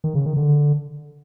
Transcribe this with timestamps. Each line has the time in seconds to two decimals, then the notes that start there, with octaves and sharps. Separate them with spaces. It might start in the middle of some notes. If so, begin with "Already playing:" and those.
0.04 D#3
0.15 C#3
0.26 D#3
0.36 D3